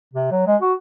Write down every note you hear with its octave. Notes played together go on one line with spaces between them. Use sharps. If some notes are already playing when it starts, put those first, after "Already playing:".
C3
F#3
G#3
F#4